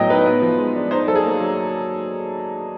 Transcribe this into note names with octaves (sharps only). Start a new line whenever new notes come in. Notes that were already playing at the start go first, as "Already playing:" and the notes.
Already playing: A2 F#3 B3 D#5 G5
D#4 B4
B3
F3
G#3
D4
D#4 C5
F#3 A4
G#4
A#3
F#3